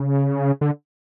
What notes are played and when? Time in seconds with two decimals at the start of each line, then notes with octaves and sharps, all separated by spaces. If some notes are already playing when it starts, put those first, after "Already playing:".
Already playing: C#3
0.61 D3